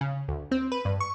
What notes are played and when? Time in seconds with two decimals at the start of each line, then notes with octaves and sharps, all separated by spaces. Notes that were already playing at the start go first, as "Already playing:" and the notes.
0.01 C#3
0.28 D2
0.51 C4
0.72 B4
0.85 G2
1.00 C#6